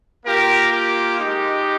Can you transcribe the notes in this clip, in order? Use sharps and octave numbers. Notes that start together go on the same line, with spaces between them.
A#3 F4 G4 A#4
G4
G#3 D#4 G4